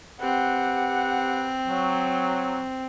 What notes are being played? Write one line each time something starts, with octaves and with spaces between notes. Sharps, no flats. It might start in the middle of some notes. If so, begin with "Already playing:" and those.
C4 G4 B4 F#5
F#3